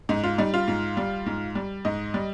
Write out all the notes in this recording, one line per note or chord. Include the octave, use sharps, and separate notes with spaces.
G#2 D#4
F4
G3 D#4
F4
G#2
G3
G#2
G3
G#2 D#5
G3